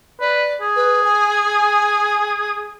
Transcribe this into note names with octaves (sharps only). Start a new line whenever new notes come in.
B4 D5
G#4
B4
G#5